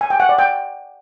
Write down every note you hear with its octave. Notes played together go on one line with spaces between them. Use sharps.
G#5
G5
F#5
D5
G5